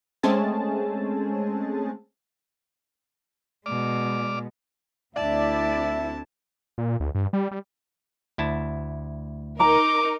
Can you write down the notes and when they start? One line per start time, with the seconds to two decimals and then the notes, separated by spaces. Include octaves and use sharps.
0.23 G#3 A3 C4 C#4 G#4 A5
3.66 B2 G#3 D5 D6 F6
5.16 D2 C4 D4 E4 D5 E5 A5
6.78 A#2
7.00 D2
7.15 G2
7.33 G3
7.51 G3
8.38 D2 E4 A5
9.60 D#4 A#4 A#5 D6